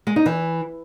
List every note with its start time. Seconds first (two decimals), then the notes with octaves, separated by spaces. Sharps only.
0.07 G#3
0.16 D#4
0.26 E3